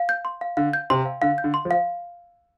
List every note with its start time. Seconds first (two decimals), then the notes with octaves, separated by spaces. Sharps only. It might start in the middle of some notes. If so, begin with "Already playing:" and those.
Already playing: F5
0.09 G6
0.25 C6
0.41 F5
0.57 D3 F5
0.73 G6
0.90 C3 C6
1.06 F5
1.22 D3 F5
1.38 G6
1.44 D3
1.54 C6
1.65 F3
1.71 F5